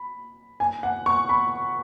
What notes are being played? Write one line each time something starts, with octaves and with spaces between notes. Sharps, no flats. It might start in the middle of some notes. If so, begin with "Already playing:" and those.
Already playing: B5
G#5
F#5
C#6
B5